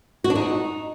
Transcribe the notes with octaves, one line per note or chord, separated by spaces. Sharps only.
F#4
D4
D#4